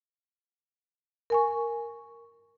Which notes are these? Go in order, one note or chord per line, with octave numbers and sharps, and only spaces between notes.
A#4 G#5 C#6